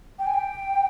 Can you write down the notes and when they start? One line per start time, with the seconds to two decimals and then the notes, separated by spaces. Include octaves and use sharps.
0.18 G5
0.26 G#5
0.33 G5